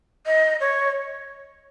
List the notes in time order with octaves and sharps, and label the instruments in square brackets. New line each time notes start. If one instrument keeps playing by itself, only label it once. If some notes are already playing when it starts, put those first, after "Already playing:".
[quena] D#5
C#5